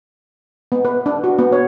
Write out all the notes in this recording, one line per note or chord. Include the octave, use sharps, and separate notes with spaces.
B3
B4
D4
F#4
B3
C#5